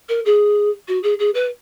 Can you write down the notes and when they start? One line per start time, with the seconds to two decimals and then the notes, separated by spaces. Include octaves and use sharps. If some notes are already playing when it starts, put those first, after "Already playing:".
0.08 A#4
0.25 G#4
0.88 F#4
1.03 G#4
1.19 G#4
1.34 B4